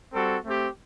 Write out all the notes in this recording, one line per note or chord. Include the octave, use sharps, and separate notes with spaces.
G3 C4 F#4 A4
A3 C4 G4